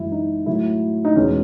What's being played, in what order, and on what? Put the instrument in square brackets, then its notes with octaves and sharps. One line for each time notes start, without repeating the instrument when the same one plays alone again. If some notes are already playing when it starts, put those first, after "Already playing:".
Already playing: [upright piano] F#2 E3 G#3 E4
D#4
A2 F#3 A3 E4
D#4
E2 B2 G#3 C#4